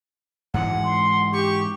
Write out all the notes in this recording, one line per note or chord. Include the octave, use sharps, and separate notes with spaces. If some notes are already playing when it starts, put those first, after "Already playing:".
G#2 E3 G#3 F#5
C6
G4 C#6